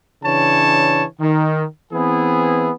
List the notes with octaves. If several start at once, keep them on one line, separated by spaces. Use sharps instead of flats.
C#3 E3 D4 C#5 A5
D#3
E3 B3 C4 E4 G#4